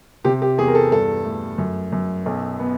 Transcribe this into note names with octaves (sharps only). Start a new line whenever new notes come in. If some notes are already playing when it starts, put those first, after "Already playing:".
C3 G4
G4
E2 G#4
A#4
A4
G2 A4
A3
F#2
F#2
B1
B3